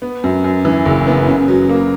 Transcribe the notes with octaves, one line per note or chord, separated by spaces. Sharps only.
B3
F#2
F#2
E3
F#1
B3
C#3
F#3
A#3